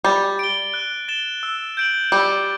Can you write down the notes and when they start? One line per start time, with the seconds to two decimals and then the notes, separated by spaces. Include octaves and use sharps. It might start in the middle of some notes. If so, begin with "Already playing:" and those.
0.04 G3 A6
0.39 D7 G7
0.74 F#6
1.08 A6 E7 G7
1.43 E6
1.77 G6 D7 F#7
2.12 G3 E6